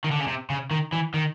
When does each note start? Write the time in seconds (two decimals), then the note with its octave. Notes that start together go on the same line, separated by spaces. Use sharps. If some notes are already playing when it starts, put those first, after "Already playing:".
0.04 D#3
0.11 D3
0.20 C#3
0.27 C3
0.50 C#3
0.71 D#3
0.92 E3
1.14 D#3